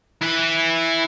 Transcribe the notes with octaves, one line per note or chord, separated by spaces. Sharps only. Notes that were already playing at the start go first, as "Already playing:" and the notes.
E4 B4